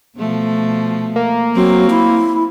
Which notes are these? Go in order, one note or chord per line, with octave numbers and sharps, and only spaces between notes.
B2 F3 A3
A#3
F#3 C4
E4